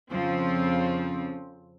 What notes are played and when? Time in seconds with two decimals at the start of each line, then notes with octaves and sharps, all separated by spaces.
0.12 F2 C#3 F3 C4